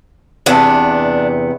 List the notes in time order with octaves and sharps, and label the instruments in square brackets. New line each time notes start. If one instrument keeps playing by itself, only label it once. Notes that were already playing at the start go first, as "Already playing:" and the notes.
[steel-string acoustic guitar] E2 C3 B3 [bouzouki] D4